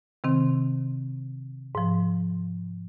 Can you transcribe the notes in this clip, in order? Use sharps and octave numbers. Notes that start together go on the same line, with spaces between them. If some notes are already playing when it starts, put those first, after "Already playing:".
C3 D#3 C4
G#2 F3